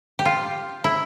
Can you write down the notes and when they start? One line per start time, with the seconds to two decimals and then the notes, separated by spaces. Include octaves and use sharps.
0.19 G4
0.25 F4
0.84 E4